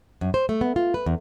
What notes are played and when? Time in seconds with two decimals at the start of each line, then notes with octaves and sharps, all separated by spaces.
0.21 F#2
0.34 C5
0.49 A3
0.61 B3
0.76 F4
0.94 B4
1.06 E2